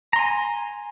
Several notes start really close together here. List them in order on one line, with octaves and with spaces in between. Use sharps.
A#5 C6 G#5